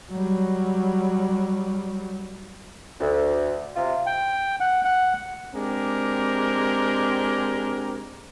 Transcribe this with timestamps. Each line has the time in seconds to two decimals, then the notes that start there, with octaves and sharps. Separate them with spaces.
0.11 F#3 G3
3.01 D2
3.76 C3 F4
4.06 G5
4.60 F#5
4.85 F#5
5.55 G#3 C4 D4 G4 A#4